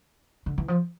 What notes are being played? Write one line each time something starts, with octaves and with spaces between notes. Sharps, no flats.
D3
E3
F3